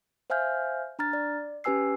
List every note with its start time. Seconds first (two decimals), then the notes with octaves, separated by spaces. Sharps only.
0.30 C5 E5 F5 G#5 F6 G6
0.99 D4 A#5 F6 A6
1.13 D5
1.64 C#4 G4 B4 G#5 E6 C7